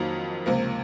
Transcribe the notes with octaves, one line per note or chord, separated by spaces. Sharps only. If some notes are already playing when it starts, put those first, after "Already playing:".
Already playing: F2 D#3 F#3 A#3 F4
C#2 C3 F3 A#3